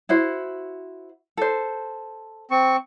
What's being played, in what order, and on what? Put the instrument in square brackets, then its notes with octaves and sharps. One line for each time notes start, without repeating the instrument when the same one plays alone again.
[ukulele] E4 F#4 C5
A4 C5
[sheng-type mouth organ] C4 C#6